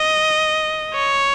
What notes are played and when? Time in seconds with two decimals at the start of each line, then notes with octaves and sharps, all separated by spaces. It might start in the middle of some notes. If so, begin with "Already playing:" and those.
Already playing: D#5
0.94 C#5